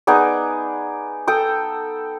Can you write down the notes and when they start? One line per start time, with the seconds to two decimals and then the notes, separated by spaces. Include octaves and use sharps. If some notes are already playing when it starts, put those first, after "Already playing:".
0.07 B3 D#4 G#4 D5
1.28 A4 G5 D#6